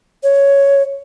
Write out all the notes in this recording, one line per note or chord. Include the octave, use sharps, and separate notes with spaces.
C#5